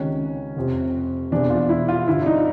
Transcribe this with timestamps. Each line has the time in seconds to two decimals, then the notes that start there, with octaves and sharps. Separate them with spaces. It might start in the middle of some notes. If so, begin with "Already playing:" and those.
Already playing: C#2 C3 D#3 C#4
0.56 F1 F2 C3
1.31 E1 E2 C3 E3 D4
1.50 F4
1.69 E4
1.88 F4
2.07 G1 G2 D3 E4
2.22 D4
2.26 D#4